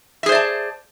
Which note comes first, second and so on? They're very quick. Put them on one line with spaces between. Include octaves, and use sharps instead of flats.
E5 G#4 C5 D5 A5